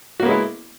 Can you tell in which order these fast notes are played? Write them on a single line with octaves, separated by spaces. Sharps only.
F#4 A#3 B3 G#3 E4